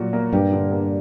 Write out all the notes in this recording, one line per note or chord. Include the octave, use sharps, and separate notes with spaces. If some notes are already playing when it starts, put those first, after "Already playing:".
Already playing: A#2 F#3 F#4
A#3
G2 G4
D3
A#3